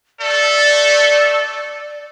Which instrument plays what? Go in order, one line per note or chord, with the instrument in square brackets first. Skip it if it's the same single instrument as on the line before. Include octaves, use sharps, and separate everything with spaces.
[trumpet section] A3 A4 [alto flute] D5